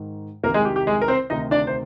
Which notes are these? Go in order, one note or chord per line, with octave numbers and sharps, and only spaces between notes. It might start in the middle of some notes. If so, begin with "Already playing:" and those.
Already playing: G#2 D#3
C2 C3 D#3 A#3 A#4
G#3 G#4
G4
G4
G#3 G#4
A#4
C4 C5
D2 C3 D#3 D#4 D#5
D4 D5
C5